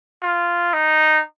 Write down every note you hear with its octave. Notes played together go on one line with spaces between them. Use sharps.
F4
D#4